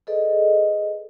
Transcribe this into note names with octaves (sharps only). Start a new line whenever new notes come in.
G#4 A4 B4 C5 D5 D#5